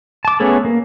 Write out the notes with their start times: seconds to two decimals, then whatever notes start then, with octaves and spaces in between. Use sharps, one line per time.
0.25 A5 D6
0.40 A3 B3 C#4 G#4 A4
0.65 A#3